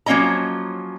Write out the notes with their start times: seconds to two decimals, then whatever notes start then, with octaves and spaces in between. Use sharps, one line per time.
0.06 F3 F#3 A#3 C#4 D#5 A#5